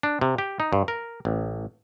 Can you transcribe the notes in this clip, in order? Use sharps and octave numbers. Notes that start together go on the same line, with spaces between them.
D4
C3
G4
D#4
G2
A#4
A1